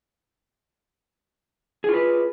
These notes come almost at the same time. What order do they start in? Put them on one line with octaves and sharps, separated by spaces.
G#4 F4 B4